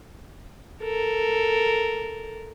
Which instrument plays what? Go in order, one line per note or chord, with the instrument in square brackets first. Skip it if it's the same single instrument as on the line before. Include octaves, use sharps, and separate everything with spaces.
[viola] A4 A#4